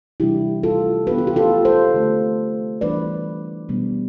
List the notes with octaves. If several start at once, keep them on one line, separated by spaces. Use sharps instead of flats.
C3 E3 G3 D4 E4 G4
F4 A4
E3 B3 D4 G4 B4
F4
G4
F4 A4
A4 C5
D3 A3 C4
E3 G3 B3 D4 B4 D5
B2 G3 B3 D4